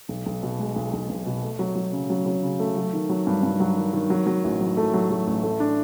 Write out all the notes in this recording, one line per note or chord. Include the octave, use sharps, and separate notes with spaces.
B1
B1
B2
G#3
B1
B1
B1
B2
A3
F#3
F#3
C#3
F#3
F#3
C#3
A3
F#3
D#3
F#3
G2
G2
F#3
D#3
D#3
F#3
F#3
A1
F#3
A3
F#3
F#3
A1
A3
D4